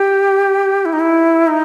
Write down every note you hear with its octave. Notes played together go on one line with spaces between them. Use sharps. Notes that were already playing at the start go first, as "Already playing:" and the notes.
Already playing: G4
E4
D#4
E4
D#4